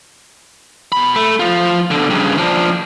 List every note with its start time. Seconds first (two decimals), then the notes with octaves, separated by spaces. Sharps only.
0.92 B2 B5
1.16 A3
1.40 F3 F4
1.91 B2 D3
2.10 G2 C#3
2.38 F3 D4